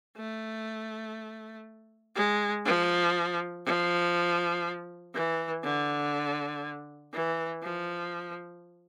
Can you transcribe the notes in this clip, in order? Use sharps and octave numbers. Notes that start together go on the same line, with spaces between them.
A3
G#3
F3
F3
E3
D3
E3
F3